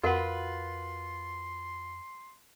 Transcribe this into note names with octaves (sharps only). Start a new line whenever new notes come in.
F2 F4 F#4 A#4 B4 F#5 C6